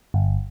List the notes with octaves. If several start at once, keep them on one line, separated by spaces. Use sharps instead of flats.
G1